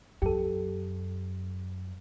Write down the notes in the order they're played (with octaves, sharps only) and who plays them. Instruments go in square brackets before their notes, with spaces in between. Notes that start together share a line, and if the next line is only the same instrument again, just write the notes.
[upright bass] F#2 [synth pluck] G4 A4